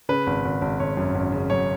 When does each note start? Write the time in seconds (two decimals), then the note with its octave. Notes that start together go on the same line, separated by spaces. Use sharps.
0.09 C#3 B4
0.27 G#1
0.45 G#1
0.62 G#1
0.80 G#1 C#5
0.97 F#2
1.15 G#1
1.32 C#3
1.50 F#2 C#5